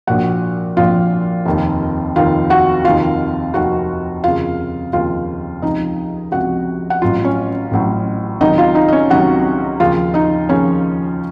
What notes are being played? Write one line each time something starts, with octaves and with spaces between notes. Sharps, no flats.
A#1 A#2 F3 F#4 F#5
A#1 A#2 F3 F4 F5
F1 D#2 D#3
F1 D#2 D#3 F4 F5
F#4 F#5
F1 D#2 D#3 F4 F5
F1 D#2 D#3 F#4 F#5
F1 D#2 C#3 F4 F5
F1 D#2 C#3 F4 F5
C#2 C3 F3 D#4 D#5
C#2 C3 F3 F#4 F#5
F#5
A1 A2 F#3 F4 F5
C#4 C#5
A1 A2 F#3
C#2 C3 D#3 F#3 D#4 D#5
F4 F5
D#4 D#5
D#5
C#4 C#5
C#2 C3 D#3 F#3 F#4 F#5
D#2 C#3 F3 F4 F5
D#4 D#5
D#2 C#3 F3 C#4 C#5